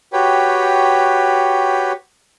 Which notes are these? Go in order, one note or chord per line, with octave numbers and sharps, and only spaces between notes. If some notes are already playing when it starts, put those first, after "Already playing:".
F#4 G4 B4 C#5 G5